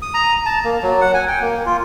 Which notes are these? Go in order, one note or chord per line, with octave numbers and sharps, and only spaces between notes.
D#6
A#5
A5
A#3
F#3
F#5
G#5
G5
A#3
F4